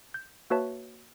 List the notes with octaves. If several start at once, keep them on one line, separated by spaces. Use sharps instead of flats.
G6
A#3 F#4 B4 C#5 E5 A5